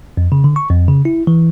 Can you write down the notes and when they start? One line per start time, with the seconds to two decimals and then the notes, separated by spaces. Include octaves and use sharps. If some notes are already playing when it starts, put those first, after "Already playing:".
0.17 F2
0.32 C#3
0.44 D3
0.56 C#6
0.70 F2
0.88 C#3
1.05 E4
1.27 E3